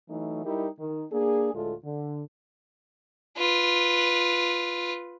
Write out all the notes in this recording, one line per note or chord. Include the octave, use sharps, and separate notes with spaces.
E3 F#3 A3 D#4
G3 D#4 E4 G4 A#4
D#3
A#3 D4 G#4
D2 A2 G#3 F4 A4
D3
F4 B4